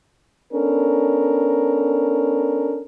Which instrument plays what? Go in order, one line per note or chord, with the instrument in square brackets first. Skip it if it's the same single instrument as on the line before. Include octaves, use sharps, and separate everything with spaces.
[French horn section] B3 C#4 D4 A4 A#4